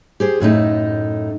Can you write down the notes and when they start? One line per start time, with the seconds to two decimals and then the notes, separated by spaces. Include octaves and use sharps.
0.20 G4 G#4 C5
0.40 F#2 A2 A3 D#4